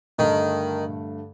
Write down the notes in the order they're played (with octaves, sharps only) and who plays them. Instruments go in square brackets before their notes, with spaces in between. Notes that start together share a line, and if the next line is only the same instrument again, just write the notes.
[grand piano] G2 D3 A3 [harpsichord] D#3